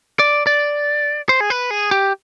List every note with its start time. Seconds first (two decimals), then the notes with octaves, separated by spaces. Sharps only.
0.19 D5
0.47 D5
1.29 C5
1.40 G#4
1.50 B4
1.71 G#4
1.91 G4